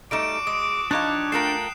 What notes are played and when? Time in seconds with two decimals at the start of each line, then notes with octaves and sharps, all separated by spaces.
0.11 G3 A3 D#4 F#4 D6 D7 E7
0.47 G#3 D#6
0.91 F3 D4 D#4 G4 C#5 F5 D6 F#6
1.32 A3 F4 A#4 F#5 G5 C7 E7